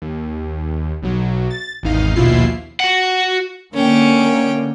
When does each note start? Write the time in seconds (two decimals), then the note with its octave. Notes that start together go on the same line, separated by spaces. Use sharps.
0.02 D#2
1.02 B1 F#3
1.50 A6
1.83 G#1 E2 D#4 F5
2.16 A#1 D#2 B2 E4 F4 C7
2.80 F#4 F#5
3.74 D3 A#3 C#4 G5